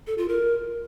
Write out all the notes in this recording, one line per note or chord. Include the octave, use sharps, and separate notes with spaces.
A4
F4
A#4